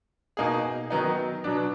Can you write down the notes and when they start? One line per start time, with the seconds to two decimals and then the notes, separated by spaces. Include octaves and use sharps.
0.37 B2 A#3 D#4 G#4
0.90 D#3 F#3 B3 D#4
1.44 B2 F#3 B3 D4